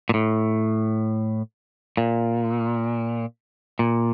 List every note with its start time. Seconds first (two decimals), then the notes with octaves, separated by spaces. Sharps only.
0.09 A#2
0.14 A2
1.97 A#2
3.79 A#2